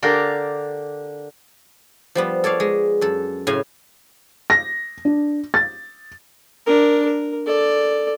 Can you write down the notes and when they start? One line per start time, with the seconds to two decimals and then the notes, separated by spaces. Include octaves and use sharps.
0.03 D3 D4 G4 A#4 F5
2.15 F3 G3 B3
2.44 A4 C#5 D5 F5
2.60 G#3
3.01 F#2 A4
3.47 A2 C#3 F5 G#5
4.50 A#6
5.05 D4
5.54 A6
6.66 D4 A#4
7.05 A#4
7.47 A4 D5